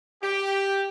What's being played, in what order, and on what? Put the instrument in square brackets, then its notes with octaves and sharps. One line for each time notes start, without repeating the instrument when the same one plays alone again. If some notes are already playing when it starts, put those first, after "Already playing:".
[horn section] G4